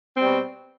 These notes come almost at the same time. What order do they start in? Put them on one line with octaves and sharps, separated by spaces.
C4 G3 B2